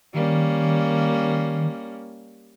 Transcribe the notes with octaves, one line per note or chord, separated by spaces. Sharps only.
D#3 G3 A#3 C#4